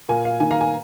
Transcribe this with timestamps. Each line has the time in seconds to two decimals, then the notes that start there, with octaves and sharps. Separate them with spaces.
0.09 A#2 A#3 G#5
0.25 F5
0.40 D#3 A#3 G#5
0.51 F5 A#5
0.61 G#5